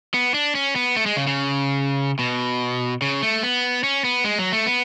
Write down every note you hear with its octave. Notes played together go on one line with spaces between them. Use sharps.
B3
D4
C#4
B3
A3
G#3
C#3
C#3
B2
C#3
A3
B3
C#4
B3
G#3
F#3
A3
B3